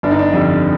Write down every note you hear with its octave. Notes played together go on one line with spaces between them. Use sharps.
G1 D4
D#4
D4
F2 D3 G3